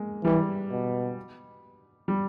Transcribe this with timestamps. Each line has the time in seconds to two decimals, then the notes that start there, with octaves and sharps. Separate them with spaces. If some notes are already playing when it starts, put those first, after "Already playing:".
Already playing: G#3 A#3
0.25 E3 G3
0.71 B2
2.08 G3